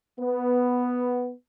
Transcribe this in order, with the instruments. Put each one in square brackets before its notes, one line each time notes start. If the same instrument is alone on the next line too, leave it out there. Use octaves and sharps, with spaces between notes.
[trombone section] B3